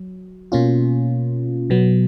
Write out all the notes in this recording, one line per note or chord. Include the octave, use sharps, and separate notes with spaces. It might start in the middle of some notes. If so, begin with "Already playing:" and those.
Already playing: F#3
B2 A#3 C#4 F4
B2 F#3 B3